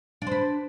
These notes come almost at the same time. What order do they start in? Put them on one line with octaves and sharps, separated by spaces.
D4 C5 B4